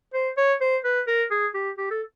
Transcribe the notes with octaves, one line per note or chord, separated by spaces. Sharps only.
C5
C#5
C5
B4
A#4
G#4
G4
G4
A4